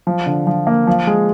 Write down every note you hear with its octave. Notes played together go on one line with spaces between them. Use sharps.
F3
D3
F3
A#3
F3
G#3